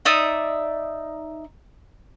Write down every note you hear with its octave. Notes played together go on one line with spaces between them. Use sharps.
D#4 D5 E5 D#6